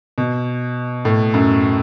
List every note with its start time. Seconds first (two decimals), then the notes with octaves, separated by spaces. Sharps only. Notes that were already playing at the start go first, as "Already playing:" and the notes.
0.18 B2
1.05 A2
1.34 F#2